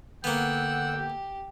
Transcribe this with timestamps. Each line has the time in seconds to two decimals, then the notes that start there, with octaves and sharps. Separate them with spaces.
0.24 D3 A#3 B3 F#5 G5 E6
0.96 G4